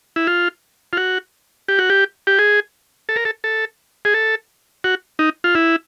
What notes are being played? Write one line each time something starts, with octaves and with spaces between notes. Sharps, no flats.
E4
F4
F4
F#4
G4
F#4
G4
G4
G#4
A4
A#4
A4
A4
G#4
A4
F#4
D#4
F4
E4